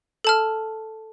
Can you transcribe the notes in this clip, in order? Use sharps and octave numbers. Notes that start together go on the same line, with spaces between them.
A4 A5 F6